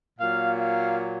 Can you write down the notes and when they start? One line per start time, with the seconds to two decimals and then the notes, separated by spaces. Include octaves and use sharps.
0.20 A#2 F#3 A#3 F5
0.57 F5